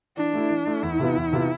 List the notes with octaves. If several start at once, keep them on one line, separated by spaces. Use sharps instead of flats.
E3 D4
A3 E4
E3
A3 E4
E2 E4
C3 E3 B3 F4
E2
C3 E3 B3 F4